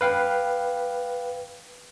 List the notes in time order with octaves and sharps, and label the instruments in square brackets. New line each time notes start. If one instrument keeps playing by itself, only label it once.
[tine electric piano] B4 F5 G5